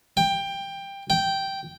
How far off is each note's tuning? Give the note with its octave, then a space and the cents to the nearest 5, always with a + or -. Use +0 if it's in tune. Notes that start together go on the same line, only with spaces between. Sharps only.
G5 +15
G5 -5